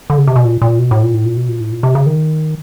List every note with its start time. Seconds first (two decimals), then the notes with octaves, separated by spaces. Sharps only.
0.10 D3
0.18 C#3
0.27 C3
0.36 B2
0.45 A#2
0.62 A#2
0.79 B2
0.91 A2
1.03 A#2
1.14 A2
1.25 A#2
1.37 B2
1.49 A#2
1.60 A2
1.72 A#2
1.83 C3
1.95 C#3
2.06 D#3